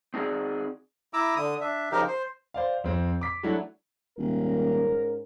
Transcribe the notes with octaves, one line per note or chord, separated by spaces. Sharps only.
C4 D#4 F#4 G#4 D5
E4 A#5 D6 E6
D3 D#6
D4 E5
C#3 F3 D#4 G4 A#4
C5
C5 D5 F5
F2 C4
D6 B6
F#3 A3 D4 E4 F#4
D#1 G#2 C#4 A#4